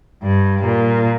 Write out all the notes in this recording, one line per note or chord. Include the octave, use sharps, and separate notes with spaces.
G2 G3
A#2